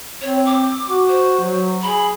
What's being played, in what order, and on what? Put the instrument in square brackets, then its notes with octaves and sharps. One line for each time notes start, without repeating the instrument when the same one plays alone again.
[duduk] C4 [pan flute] C#5
[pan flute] D6
[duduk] F#4
[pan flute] C5
[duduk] F#3
[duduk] G#4 [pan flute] B5